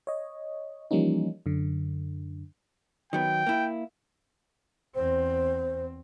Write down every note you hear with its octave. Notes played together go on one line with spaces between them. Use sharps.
C#5 D#5
E3 F3 G3 A#3 C#4 D#4
F#2 D3
D#3 F#3 B3 G5
A#3 E4
E2 C4 C5